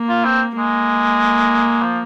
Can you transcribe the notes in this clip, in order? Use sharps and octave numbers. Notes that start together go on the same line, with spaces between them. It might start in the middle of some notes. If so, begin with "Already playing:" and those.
Already playing: A#3
F4
C4
G#3 A#3
F3